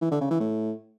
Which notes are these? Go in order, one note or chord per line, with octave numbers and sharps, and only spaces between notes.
E3
D3
C#3
E3
A2